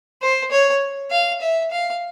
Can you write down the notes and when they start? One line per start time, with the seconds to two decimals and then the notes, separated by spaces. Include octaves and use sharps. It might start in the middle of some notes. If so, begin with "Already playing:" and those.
0.22 C5
0.51 C#5
1.11 F5
1.41 E5
1.71 F5